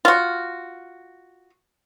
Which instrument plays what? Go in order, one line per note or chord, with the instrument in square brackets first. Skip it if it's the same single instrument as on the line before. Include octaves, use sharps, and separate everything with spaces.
[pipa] F4 F#4